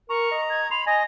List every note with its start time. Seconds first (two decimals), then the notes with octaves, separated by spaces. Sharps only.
0.10 A#4 A#5 C#6
0.31 D#5
0.50 G#6
0.71 B5 C6 F7
0.87 D#5 G#5 A#6